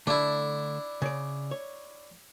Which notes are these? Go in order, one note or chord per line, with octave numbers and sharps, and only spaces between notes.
D3 A3 D4 E4
C#3 D5
C#5